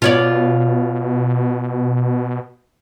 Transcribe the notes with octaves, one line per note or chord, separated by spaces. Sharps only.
B2 F4 C#5 D5